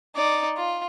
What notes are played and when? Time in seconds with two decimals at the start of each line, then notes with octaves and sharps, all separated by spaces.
0.15 D#4 D5
0.57 F4